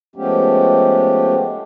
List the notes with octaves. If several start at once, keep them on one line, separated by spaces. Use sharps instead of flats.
F3 G#3 A3 B3 C#4 G4